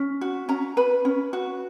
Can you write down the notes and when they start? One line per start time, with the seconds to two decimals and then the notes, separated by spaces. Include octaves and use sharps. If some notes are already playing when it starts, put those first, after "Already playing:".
Already playing: C#4
0.21 F#4
0.49 C#4 A#5
0.77 B4 B5
1.05 C#4
1.33 F#4